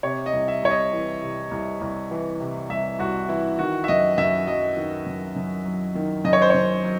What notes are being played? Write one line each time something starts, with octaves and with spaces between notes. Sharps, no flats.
C3 C#5
D#5
C2
E5
C2 C#5
D#5
E3
C3
C2
C2
E3
C3
C2 E5
C2 F#4
E3 E4
D#3 F#4
E5
F#2 D#5
F#2 E5
F#3 D#5
D#3
F#2
F#2
F#3
D#3
F#2 D#5
C#5
C5
F#2 C#5
F#3